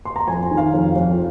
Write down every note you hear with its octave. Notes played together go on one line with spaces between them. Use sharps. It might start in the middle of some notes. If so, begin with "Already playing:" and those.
C6
A#5
F2 G#5
G#5
D#3
F5
F2
F2